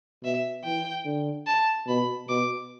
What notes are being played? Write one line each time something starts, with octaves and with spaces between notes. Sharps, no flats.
B2 E5
E3 G5
D3
A5
B2 B5
B2 D6